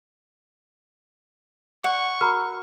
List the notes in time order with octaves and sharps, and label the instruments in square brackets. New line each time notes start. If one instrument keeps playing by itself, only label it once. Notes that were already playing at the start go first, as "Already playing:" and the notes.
[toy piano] D5 [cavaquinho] F#5 [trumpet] C#6
[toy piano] F#4 A#4 B5 [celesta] A#5 F6